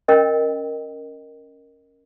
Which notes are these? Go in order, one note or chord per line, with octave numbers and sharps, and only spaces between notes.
C#4 A#4 D#5 G5